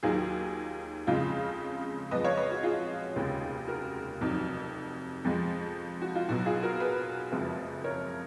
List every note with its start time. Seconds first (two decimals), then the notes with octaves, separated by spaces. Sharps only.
0.03 D#2 D#3 F#3 F4 G#4
1.07 F2 C#3 G#3 F4
2.11 F2 F3 G#3 B4 D#5
2.24 C#5 F5
2.37 B4 D#5
2.51 F#4
2.63 F4 G#4
3.16 F1 D#2 C#3 G#3
3.67 F#4 A#4
4.20 F1 F2 D#3 F#3
5.24 F2 F3 G#3
6.02 F#4
6.15 F4
6.29 B1 B2 F#3 F#4
6.46 F4 G#4
6.62 F#4 A#4
6.80 G#4 B4
7.32 F#1 F2 F3 G#3
7.84 A#4 C#5